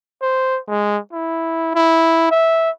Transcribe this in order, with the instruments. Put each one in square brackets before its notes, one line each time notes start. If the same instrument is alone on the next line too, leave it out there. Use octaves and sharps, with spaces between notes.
[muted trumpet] C5
G#3
E4
E4
E5